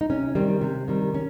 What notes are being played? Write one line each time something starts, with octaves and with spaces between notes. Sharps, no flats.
D#4
C3 C#4
D#3 G3 C4
C3
D#3 G3
C#4